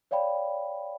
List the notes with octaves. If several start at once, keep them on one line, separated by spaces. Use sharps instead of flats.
C#5 D5 F5 G5 B5